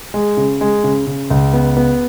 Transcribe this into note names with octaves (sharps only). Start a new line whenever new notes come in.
G#3
C#3
G#3
C#3
C#3
C#2
B3
B3